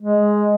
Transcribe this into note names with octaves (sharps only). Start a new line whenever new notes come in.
G#3